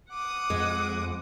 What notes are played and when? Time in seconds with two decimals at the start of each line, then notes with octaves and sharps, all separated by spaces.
0.11 F#5 D6 D#6
0.50 F2 G#3